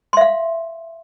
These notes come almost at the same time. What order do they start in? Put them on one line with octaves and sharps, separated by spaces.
C6 E5 F5